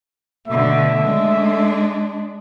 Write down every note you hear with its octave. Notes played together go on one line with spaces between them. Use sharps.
B2 D3 A3 E5
G#3 D4